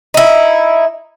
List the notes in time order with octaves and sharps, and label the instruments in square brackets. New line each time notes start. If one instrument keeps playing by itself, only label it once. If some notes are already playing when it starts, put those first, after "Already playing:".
[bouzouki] D#4 E4